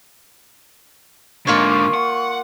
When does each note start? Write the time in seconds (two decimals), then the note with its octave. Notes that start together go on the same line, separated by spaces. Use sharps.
1.47 G#2 D3 A#3 F4 C#5 C#6
1.94 F#5